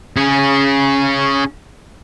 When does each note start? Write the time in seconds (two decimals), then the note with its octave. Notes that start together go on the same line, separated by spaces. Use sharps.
0.17 C#4 G#4